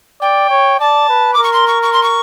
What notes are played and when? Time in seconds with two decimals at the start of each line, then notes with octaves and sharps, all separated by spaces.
0.21 D5 G5
0.50 C#5
0.80 D5 A5
1.09 B4
1.34 A#4 D6
1.44 C#6
1.53 C6
1.67 C#6
1.83 C#6
1.93 C6
2.03 C#6